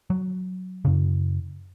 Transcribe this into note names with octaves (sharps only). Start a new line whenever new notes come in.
F#3
F#2 C#3